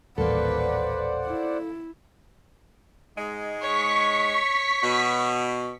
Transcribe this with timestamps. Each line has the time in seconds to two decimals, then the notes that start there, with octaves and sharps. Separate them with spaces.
0.18 D#1 A1 A#3 A4 B4 C5 D5 F#5
1.26 E4
3.18 G#2 G#3
3.62 C#5 C#6 B6
4.83 B2